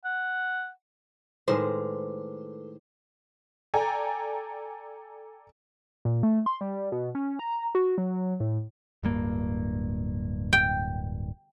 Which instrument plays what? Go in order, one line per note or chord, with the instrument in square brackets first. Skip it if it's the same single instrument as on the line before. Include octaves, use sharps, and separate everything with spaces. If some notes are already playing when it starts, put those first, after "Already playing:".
[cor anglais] F#5
[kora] A2 D#3 G#3 [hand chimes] A4 B4 D6 [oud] C5
[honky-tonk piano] A4 D5 G5 G#5 A#5
[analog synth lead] A#2
A3
C6
G3
B2
C#4
A#5
F#4
F#3
A2
[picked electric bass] D1 G2 A#3
[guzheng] G5